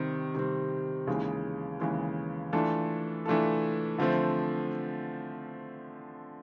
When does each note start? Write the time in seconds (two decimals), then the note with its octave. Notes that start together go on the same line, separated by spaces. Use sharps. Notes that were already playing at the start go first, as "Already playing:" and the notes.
Already playing: C3 D#3 G3 C4
0.35 C3 D#3 G3 C4
1.07 D#2 C#3 E3 G#3
1.80 D#2 C#3 E3 G#3
2.53 E3 A3 D4 F4 A4
3.26 E3 A3 D4 F4 A4
3.98 D3 F3 A3 C4